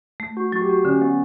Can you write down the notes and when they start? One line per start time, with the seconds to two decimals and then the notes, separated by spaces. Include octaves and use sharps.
0.20 A3
0.37 F#4
0.52 F#3 F#4
0.62 G4
0.69 F#4
0.85 D3 C#4
1.02 B3